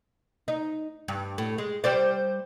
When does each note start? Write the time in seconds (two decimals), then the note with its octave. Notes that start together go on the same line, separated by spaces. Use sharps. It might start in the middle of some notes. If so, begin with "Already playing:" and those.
0.48 D#4
1.08 G2
1.38 A2
1.58 G#3
1.84 G3 C5 D5